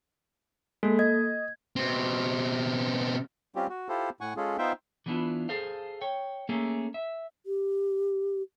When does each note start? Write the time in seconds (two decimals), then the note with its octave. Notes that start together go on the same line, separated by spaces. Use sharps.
0.83 G#3 A#3 A4
0.99 D#5 G#6
1.76 B2 C4
3.56 G3 C4 C#4 F4 G4
3.70 F#4
3.89 E4 F4 G4 A4 C5
4.21 A2 F#5 G#5 C#6
4.37 G#3 C#4 F4 G#4 A4
4.58 B3 D#4 F4 C5 E5 G5
5.06 E3 F#3 B3 D4 E4 F4
5.49 G#4 A4 C5 F5
6.01 C#5 G5
6.49 A3 A#3 C#4 G#4 A4
6.94 E5
7.46 G4